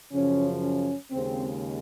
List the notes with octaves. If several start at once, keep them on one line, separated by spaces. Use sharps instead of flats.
F#2 C#3 F3 C#4
C#4
D#2 C#3 G#3 C4